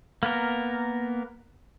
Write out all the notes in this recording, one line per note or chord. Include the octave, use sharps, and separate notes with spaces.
A#3 B3 A#4